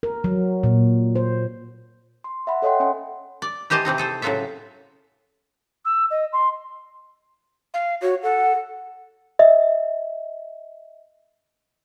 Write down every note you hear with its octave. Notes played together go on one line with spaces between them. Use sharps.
A#4
F#3
A#2
C5
C6
E5 F#5 B5
A4 C#5 D#5 F#5 G5 C6
C#4 G#5
D5
E3 G4 C5 D#5 A5
C3 E3 C4 D#4
G#4 A4 C5
A2 C#3 F#3 F4 A4 E5
E6
D#5
C6
F5
F#4 C#5
A4 F#5
D#5 E5